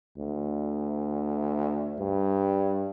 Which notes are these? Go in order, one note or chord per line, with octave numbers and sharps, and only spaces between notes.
D2
G2